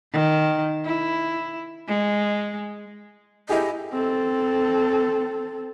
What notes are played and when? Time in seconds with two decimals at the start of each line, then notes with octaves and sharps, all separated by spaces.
0.13 D#3
0.85 E4
1.88 G#3
3.49 E4 G4 G#4 D#5
3.92 C4 A4